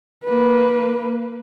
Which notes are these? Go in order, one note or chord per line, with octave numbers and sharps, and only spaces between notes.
A#3 B4